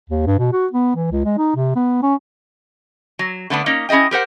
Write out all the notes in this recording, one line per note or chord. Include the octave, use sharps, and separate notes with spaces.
D#2
G2
B2
F#4
B3
E3
C#2
G#3
D#4
C3
B3
C#4
F#3
D3 A3 B3 D4
A#3 C#4 D#4
C#4 E4 G#4 D#5 G5
G4 A#4 C5 F#5